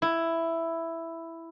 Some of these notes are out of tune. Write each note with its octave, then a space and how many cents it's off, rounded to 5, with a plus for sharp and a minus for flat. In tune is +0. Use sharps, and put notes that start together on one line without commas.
E4 +5